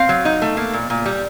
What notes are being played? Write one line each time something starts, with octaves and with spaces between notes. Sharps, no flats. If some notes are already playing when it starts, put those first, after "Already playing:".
Already playing: C4 F5
F#3
D#4
A3
A#3
A#2
A#2
G3